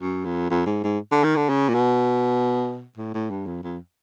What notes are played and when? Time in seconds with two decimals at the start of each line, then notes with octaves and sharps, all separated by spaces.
0.01 F#2
0.25 F2
0.50 F2
0.66 G#2
0.84 G#2
1.11 D3
1.24 D#3
1.36 D3
1.49 C#3
1.69 A#2
1.74 B2
2.97 A2
3.14 A2
3.30 G2
3.46 F2
3.63 F2